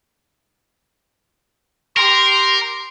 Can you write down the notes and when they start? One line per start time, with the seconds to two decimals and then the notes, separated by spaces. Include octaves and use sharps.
1.97 G4 A#4 C6